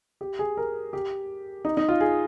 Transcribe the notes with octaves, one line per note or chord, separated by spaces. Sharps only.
G4
G#4
A#4
G4
D#4
D#4
F4
G#4